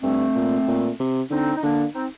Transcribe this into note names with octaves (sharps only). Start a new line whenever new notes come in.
G2 A3 C4
A#2
A#2
C3
D3 C4 D#4
D#4
D3 A#3 D4
C4 D#4